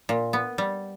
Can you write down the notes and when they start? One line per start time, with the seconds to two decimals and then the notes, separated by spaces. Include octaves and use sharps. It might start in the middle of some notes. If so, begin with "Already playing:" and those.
0.09 A#2
0.33 B3
0.58 G3